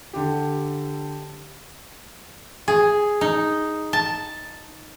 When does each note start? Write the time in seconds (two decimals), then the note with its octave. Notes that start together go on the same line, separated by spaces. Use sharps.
0.13 D3 G4
2.68 G#4
3.21 D#4
3.93 A5